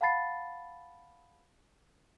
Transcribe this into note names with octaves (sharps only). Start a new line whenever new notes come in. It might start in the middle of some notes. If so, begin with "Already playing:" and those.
F5 F#5 A5 B5 A6 C7